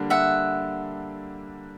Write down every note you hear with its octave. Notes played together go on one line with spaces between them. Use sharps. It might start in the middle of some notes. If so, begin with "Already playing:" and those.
Already playing: D3 G3 A#3 D4
E5 F#5